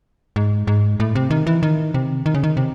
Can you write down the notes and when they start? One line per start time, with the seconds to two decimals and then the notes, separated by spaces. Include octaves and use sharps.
0.36 G#2
0.67 G#2
1.00 A2
1.15 C3
1.31 D#3
1.47 E3
1.63 D#3
1.94 C3
2.26 D#3
2.34 C#3
2.44 D#3
2.57 C3